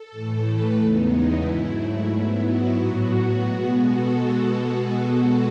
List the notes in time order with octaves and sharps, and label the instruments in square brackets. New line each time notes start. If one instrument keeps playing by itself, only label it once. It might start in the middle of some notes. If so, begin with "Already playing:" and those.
Already playing: [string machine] A4
A2 E3 A3
B4
E2 C#3 G#3 B3 D#4
E4
G#2 F#3 A3
G#2 F#3 B3
F#4
A2 F#3 B3 F#4
B2 G#3 B3
A4